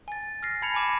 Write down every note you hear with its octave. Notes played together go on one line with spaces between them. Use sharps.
G#5 A6
F6 A#6 C7
A5 B5 G#6 A#6 C#7 F7
G#5 B5 D6 E7